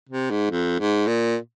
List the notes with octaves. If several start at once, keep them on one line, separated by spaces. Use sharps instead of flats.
C3
G#2
F2
G#2
A#2